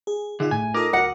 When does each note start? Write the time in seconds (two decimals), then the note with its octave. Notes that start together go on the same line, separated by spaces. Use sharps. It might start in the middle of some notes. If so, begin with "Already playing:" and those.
0.07 G#4
0.40 D3 D#3 D#4 F4 G#4 E5
0.51 G1 A2 G#5
0.74 D#4 F4 A4 A#4 D6 D#6 A#6
0.93 D2 F#4 F#5